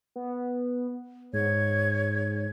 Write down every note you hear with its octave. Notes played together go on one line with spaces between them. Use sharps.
B3
G#2 C#5 G#6